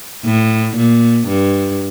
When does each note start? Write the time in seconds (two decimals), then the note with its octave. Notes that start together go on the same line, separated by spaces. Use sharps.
0.25 A2
0.77 A#2
1.28 G2